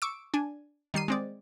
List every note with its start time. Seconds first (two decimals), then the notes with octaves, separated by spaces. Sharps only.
0.02 C#6 D6 E6 D7
0.34 D4 G#5
0.94 D#3 G3 C7 D#7
1.08 G#3 C4 D5